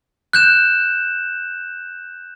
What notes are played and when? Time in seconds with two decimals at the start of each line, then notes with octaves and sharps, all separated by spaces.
0.33 F#6 G6 E7